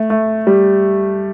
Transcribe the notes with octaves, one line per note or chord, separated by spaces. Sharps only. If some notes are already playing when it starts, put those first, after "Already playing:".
Already playing: A3
A3
G3